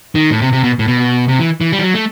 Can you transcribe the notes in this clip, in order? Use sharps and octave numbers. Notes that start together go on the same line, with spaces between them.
D#3
A2
C3
C3
B2
A2
B2
C3
E3
E3
G3
E3
F#3
A3